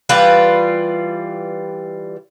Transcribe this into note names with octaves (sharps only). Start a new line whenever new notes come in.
E3 G3 F4 B4